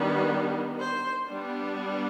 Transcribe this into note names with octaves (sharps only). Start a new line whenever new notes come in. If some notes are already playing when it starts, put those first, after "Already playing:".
Already playing: D#3 G3 B3 D4
C5
G3 B3 D4